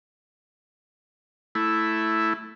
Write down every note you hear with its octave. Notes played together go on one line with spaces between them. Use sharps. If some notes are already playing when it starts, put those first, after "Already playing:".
A3 E4